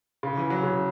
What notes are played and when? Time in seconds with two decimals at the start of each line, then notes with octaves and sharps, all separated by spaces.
0.23 C#3
0.37 E3
0.50 F#3
0.63 C#3